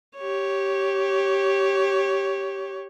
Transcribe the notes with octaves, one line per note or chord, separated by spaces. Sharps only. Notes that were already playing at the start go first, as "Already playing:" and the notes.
G4 C#5